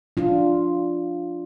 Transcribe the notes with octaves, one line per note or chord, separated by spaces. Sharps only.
D4 F4